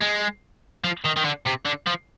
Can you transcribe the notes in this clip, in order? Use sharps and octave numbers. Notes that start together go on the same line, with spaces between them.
G#3
F3
D#3
D#3
D3
C3
D3
F3